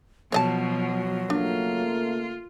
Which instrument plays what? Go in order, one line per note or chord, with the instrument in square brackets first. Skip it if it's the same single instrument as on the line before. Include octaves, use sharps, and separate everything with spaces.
[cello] B2 F3 [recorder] F#3 [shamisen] C#5 D#5 A5
[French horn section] C#3 A3 A#3 [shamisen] D4 [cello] F4